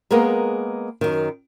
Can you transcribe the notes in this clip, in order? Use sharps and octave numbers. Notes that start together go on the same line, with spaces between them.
G#3 A#3 B3 G#4 A#4
F#2 D#3